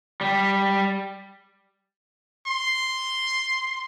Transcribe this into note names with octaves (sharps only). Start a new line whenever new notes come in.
G3
C6